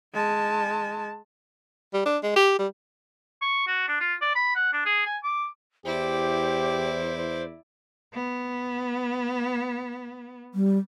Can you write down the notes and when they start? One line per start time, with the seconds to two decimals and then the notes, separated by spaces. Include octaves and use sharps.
0.14 G#3 A5
1.94 G3
2.06 D4
2.23 G#3
2.36 G4
2.59 G3
3.42 C#6
3.67 F#4
3.88 D4
4.00 F4
4.21 D5
4.35 B5
4.55 F#5
4.73 D4
4.86 G#4
5.06 G#5
5.23 D6
5.85 E2 E4 G4 C5 D5
7.18 C5
8.12 B3
10.54 G3